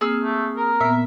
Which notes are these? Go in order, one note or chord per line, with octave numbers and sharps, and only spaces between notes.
A#3 C4 G#4 E6 F6
A3
A#4
A#2 B3 E5